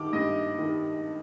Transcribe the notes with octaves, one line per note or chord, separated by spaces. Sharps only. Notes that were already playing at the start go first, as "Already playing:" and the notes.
Already playing: D#3 G3 D6
G2 D#5
D#3 G3